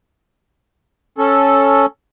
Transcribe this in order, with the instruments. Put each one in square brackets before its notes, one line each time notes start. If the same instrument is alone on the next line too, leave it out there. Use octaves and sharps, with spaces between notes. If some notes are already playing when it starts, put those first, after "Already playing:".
[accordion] C#4 A4